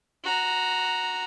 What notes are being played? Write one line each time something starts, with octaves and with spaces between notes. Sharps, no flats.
F#4 A#5